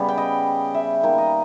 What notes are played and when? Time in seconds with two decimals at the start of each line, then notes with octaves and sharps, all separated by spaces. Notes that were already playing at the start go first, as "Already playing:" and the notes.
Already playing: C#3 G3 B3
0.08 G5
0.18 D#5
0.74 E5
1.03 D#3 A#3 G5
1.18 D#5